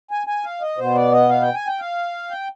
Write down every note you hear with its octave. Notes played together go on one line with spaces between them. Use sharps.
G#5
G#5
F5
D#5
B2 B3 C5
D5
D#5
F5
G5
G#5
G5
F5
G5